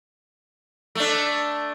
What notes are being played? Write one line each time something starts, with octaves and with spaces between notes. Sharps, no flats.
A3 D4